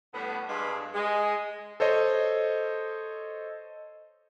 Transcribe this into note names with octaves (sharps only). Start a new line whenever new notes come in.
A2 D3 G3 B3
G2 F3 G#3 D4 F4 B4
G#3
A4 C5 C#5 D#5